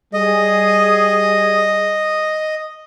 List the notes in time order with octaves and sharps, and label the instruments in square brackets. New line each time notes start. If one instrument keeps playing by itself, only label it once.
[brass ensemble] G3 G#4 [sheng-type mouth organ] D#5